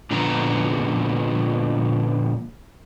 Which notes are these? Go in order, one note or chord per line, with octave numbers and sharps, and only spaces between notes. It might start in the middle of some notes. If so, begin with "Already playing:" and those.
A#2 D3 F3 A#3 B3 A#5